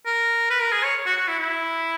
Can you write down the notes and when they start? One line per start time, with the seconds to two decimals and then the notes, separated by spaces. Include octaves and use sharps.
0.06 A#4
0.50 B4
0.61 A#4
0.72 G#4
0.84 C#5
1.06 F#4
1.17 F#4
1.28 E4
1.39 E4